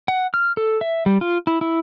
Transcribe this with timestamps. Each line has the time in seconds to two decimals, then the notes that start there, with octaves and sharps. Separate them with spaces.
0.08 F#5
0.34 F6
0.57 A4
0.81 E5
1.06 G3
1.21 F4
1.47 E4
1.61 E4